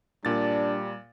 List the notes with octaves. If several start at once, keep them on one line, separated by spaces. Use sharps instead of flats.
A#2 G3 D4 A6